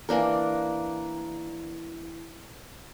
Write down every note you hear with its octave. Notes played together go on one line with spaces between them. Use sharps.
E3 A#3 D4 A#4